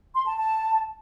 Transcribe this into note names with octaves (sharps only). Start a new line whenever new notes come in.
C6
A5
A5